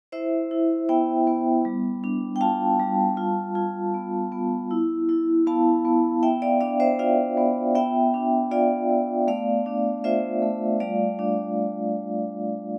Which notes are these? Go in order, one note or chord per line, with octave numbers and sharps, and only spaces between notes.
E4 C5 E5
E4
B3 E5 G5
B3
G3
D4
G5
F4 F5 A5
G3
F4
F4
B3
B3
E4
E4
B3 F5 A5
B3
B3 E5 G5
D5 F5
D4 D5 F5
C5 E5
F4 D5 F5
B3
B3 E5 G5
D4
F4 D5 F5
B3
A3 D5 F5
D4
F4 C5 E5
A3
G3 D5 F5
D4